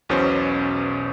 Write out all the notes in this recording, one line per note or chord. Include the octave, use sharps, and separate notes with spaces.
B1 E2 B2 B3 C#4 C5